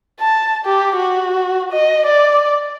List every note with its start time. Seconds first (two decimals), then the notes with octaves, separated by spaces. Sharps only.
0.20 A5
0.66 G4
0.97 F#4
1.72 D#5
2.06 D5